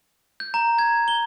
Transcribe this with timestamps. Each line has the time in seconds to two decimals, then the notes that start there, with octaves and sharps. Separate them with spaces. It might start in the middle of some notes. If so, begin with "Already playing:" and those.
0.40 G6
0.54 A#5
0.79 G#6
1.08 G7